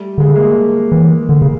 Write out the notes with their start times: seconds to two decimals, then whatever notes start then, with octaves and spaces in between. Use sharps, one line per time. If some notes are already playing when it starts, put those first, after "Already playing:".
Already playing: G3 A3
0.18 D3 G#3
0.28 A3
0.36 G#3 A#3
0.92 E3
1.29 D3
1.42 C#3